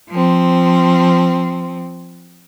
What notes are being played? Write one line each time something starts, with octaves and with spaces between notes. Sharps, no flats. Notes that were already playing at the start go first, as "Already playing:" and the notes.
F3 C4